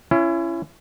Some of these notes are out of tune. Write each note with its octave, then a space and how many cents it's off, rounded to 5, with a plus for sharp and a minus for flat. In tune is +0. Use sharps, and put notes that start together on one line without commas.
C#4 +0 E4 +35